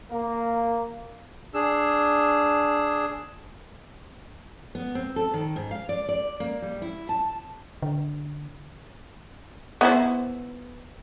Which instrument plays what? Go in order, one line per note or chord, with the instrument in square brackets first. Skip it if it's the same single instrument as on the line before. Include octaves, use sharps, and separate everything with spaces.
[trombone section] A#3
[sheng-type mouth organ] D4 G#4 E6
[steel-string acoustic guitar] B3
C4
A4
D#3
G#2
F5
D5
D5
A#3
G3
E4
A5
[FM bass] D3
[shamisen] B3 E4 C5